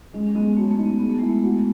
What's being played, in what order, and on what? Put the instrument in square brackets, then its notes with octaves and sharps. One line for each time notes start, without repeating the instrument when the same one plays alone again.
[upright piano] G#3 [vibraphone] C#4
[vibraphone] C#4
[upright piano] G#3 [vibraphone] B3
[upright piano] F#3 [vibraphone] A3
[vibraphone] A3
[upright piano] D#4
[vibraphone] B3
[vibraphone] B3 [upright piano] G#4
[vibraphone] A3
[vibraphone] G#3 [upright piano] E4
[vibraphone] A3
[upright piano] F#4